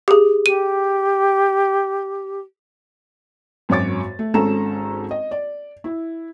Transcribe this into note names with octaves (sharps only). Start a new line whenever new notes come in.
G4 G#4
G4 D#7
G#1 F#2 F#4 C#5 D6 A6
A3
G#1 G#2 C#4 A4 A#5 E7
D#5
D5
E4